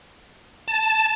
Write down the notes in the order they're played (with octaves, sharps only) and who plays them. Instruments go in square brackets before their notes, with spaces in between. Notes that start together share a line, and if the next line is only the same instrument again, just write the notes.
[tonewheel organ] A5